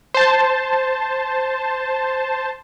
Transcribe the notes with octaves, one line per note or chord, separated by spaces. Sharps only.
C5 A5